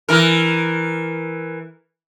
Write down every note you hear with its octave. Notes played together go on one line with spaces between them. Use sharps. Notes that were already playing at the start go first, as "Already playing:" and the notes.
E3 A#4